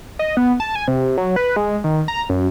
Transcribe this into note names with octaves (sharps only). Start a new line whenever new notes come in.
D#5
B3
A5
G#5
C3
F#3
B4
G#3
D#3
A#5
F#2